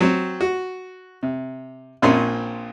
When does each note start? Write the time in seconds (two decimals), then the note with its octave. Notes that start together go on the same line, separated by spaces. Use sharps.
0.01 F#3 C4
0.41 F#4
1.23 C3
2.02 A#1 A#2 C4 C#4 C6